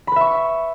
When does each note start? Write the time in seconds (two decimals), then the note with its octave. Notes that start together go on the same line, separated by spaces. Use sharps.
0.07 B5
0.12 B4
0.16 E5
0.21 C#6